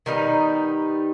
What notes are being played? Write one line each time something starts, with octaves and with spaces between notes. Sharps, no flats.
D#3 G3 B3 D#4